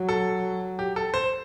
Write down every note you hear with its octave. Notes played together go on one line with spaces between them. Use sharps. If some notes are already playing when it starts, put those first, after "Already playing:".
Already playing: F#3
A4
G4
A4
C5